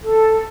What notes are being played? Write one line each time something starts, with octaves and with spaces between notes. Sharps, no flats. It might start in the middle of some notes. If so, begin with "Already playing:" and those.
A4